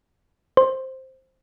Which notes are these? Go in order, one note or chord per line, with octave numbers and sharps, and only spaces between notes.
C5